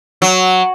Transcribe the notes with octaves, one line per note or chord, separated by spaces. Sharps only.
F#3